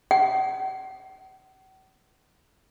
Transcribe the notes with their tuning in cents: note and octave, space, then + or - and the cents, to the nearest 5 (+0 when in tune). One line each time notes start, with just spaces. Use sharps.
F#5 +45